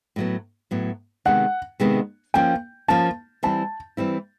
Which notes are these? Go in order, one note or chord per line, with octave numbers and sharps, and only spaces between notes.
A2 F#3 B3
A2 F#3 B3
C3 D#3 G#3 B3 F#5
C3 D#3 G#3 B3
F3 A#3 C#4 G5
F3 A#3 C#4 A5
E3 G3 C4 E4 A5
E3 G3 C4 E4